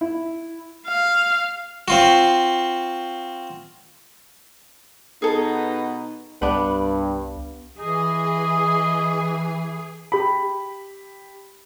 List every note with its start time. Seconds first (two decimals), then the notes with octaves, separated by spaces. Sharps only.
0.01 E4
0.87 F5
1.88 C4 F4 F#4
5.22 B2 B3 D#4 G#4 A4
6.42 C2 G2 B3 D4
7.79 E3 G#4 D#5
10.12 G4 B5